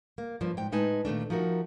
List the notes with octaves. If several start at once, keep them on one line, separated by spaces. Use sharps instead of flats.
A#3
G2 F3 A#3
G#2 G5
A2 G#3 D#4 B4 G#5 A5
A#2 D#3 A3 D4
F3 D#4 F#4 A#4 E5